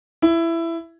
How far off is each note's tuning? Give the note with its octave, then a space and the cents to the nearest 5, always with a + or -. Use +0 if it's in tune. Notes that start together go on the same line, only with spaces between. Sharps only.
E4 +15